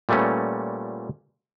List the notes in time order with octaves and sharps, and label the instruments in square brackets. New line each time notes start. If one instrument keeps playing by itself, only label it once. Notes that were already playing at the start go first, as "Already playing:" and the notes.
[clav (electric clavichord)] A#2 G3 A3 B3 C#4